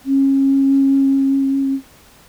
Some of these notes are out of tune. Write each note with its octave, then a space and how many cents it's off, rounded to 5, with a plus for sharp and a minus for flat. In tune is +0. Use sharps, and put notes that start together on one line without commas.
C#4 -30